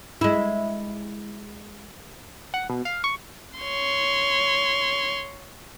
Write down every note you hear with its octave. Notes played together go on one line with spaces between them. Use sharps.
G#3 E4
F#5
B2
F5
C#6
C#5 C6